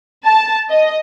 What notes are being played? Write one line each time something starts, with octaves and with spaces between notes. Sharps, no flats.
A5
D#5